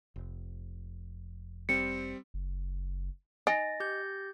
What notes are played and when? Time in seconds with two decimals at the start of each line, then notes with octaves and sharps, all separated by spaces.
0.16 F1
1.69 G3 C4 C#7
2.34 F#1
3.47 D#4 G#5 A6 A#6
3.80 G4 G6